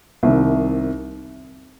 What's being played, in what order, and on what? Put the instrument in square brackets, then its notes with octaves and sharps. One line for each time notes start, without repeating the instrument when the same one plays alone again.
[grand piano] C2 C3 D#3